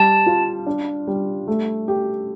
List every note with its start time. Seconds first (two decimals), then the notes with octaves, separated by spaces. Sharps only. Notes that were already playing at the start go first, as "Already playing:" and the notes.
Already playing: G3 A5
0.26 F4
0.67 D4
1.07 G3
1.48 A3
1.88 G4